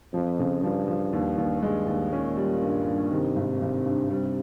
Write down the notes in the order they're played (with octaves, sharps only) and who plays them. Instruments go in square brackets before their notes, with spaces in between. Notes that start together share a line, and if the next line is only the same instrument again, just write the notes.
[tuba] F2 [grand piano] F3
[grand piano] C#3
[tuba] G2 [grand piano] F3
[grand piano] F3
D#2
D#2
[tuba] G2 [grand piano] G#3
[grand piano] D#2
[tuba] A#2 [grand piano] C#4
[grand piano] G3
G2
G2
[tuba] C3 [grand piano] D#3
[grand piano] G#1
G#1
G2
[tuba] C3 [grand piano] G3